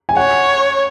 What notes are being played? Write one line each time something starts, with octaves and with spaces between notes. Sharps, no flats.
G#5
C#5 F#5